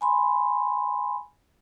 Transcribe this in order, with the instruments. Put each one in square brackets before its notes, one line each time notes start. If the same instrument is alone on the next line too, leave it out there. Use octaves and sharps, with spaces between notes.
[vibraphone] G#5 B5 C6